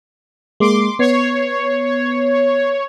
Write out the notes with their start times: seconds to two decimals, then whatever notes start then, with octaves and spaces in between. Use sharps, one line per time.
0.60 G#3 A#3 C6 D6
0.99 B3 C#5 C7